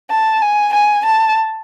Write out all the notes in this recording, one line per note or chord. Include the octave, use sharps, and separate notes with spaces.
A5
G#5
G#5
A5